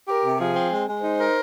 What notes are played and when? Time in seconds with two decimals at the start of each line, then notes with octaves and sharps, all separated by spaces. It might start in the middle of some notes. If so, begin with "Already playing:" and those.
0.08 G4 A#4
0.24 C3
0.40 F3 G#4
0.55 C4
0.72 G#3
0.87 G#3
1.03 D#4 C5
1.20 A#4